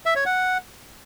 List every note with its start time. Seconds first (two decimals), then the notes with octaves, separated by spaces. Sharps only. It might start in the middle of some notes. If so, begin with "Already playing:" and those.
0.06 E5
0.16 C#5
0.26 F#5